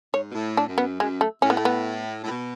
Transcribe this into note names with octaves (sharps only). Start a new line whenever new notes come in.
G#2 C#5
B2
A2
D4
F#2
B3
F#2 G#3
A3
A2 C#4
B3
A3
B3
A2
B2